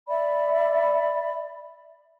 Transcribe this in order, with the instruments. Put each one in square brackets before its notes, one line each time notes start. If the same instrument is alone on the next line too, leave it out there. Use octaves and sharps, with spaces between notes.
[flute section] D5 E5 B5